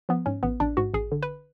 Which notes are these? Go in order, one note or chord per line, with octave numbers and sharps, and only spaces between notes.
F3 B3
G#2 C#4
A1 B3
A1 D4
G#2 F#4
A1 G#4
D3
B4